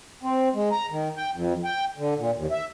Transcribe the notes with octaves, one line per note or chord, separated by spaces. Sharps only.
C4
G#3
A#5
D#3
G5
F2
G5
D3
A#2
D#2
E5